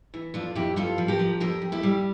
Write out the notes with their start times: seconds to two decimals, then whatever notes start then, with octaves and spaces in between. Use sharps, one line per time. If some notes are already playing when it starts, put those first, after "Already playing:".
0.14 E3
0.34 F2 D4 F4
0.55 F2 E4 G4
0.76 G2 F4 A4
0.98 F3
1.08 G4 A#4
1.19 F3
1.40 F2 G4 A#4
1.62 F2
1.72 E4 G4
1.83 G3